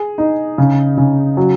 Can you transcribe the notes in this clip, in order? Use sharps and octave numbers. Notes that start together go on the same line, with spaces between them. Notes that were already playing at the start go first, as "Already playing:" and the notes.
Already playing: G#4
D#4
C#3
C#3
F#3